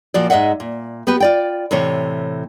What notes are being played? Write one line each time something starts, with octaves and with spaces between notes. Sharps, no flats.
A#2 F3 F#4 D5
G#2 G#3 D#5 E5 F#5
A#2
B3 F#4 G4 B4
F4 D5 G5
A2 C3 E3 C#5